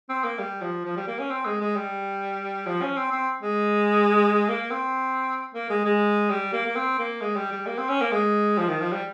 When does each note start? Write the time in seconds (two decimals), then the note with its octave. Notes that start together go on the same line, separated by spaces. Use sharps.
0.09 C4
0.24 A#3
0.39 G3
0.62 F3
0.85 F3
0.96 G3
1.07 A#3
1.19 C#4
1.30 C4
1.46 G#3
1.61 G#3
1.76 G3
2.66 F3
2.82 C#4
2.97 C4
3.12 C4
3.43 G#3
4.49 A#3
4.71 C4
5.54 A#3
5.70 G#3
5.85 G#3
6.30 G3
6.53 A#3
6.66 A#3
6.76 C4
6.99 A#3
7.21 G#3
7.36 G3
7.52 G3
7.67 A#3
7.78 C4
7.89 C#4
8.01 A#3
8.12 G#3
8.58 F3
8.69 D#3
8.81 F3
8.92 G3